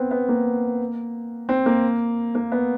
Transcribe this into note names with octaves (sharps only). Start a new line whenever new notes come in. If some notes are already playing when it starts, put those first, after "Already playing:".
Already playing: B3 C4
B3
A#3
C4
A#3
A#3
B3